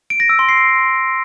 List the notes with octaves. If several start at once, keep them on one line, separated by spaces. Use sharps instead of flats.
D7
A#6
E6
C6
C7